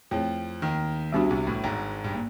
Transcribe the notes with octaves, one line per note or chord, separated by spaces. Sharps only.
F2 F3 A3 C4 E4 G#4 C#5
D#2 D#3
C2 C3 G3 B3 D4 F#4
C2 C3
A1 A2
G#1 G#2
G2
A#3